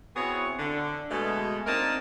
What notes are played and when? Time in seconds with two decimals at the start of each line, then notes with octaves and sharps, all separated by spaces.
0.16 B3 C4 E4 F#4 G#4 C#5
0.59 D3
1.11 B2 G#3 A3
1.67 A#3 C4 D4 D#4 A#4 A5